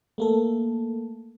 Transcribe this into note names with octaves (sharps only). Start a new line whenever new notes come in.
A3 A#3 A4